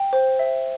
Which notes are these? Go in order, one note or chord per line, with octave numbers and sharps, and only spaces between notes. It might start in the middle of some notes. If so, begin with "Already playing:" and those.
Already playing: G5
C5
E5